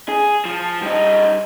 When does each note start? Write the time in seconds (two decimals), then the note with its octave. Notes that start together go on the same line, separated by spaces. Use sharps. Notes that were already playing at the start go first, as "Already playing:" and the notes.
0.09 G#4
0.45 F3
0.83 G3 D#4